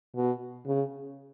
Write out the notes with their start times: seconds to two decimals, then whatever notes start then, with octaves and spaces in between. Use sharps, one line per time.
0.16 B2
0.66 C#3